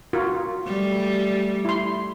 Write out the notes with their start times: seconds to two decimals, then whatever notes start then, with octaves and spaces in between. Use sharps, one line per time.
0.13 F4 F#4 A#4
0.67 G3 A3
1.65 E4 C6